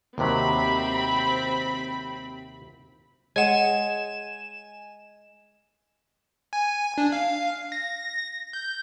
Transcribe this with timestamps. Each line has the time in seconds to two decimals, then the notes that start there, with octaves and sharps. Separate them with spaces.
0.18 D#2 C3 F#3 C4 B5
3.36 G#3 C#5 F#5 G#5 E7
6.53 G#5
6.98 D4
7.12 F5
7.72 A#6
8.53 G6